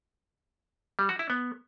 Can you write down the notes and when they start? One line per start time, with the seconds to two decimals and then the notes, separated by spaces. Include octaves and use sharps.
0.99 G3
1.09 F#4
1.19 E4
1.30 B3